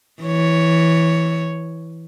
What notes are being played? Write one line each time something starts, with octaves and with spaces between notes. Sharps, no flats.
E3 C#5